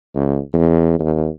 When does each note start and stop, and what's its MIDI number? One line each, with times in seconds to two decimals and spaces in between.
0.15 0.39 37
0.54 0.94 40
1.00 1.27 39